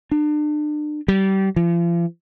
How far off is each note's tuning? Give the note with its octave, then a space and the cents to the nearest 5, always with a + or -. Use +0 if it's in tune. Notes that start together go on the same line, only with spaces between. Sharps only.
D4 +35
G3 -25
F3 -40